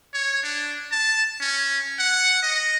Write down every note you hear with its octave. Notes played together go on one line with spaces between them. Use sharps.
C#5
D4
A5
C#4
F#5
D#5